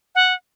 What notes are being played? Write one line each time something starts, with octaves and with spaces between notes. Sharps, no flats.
F#5